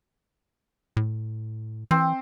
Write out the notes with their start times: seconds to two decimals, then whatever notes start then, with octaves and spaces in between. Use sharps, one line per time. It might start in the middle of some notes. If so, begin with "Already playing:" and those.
0.97 A2
1.91 E3 C4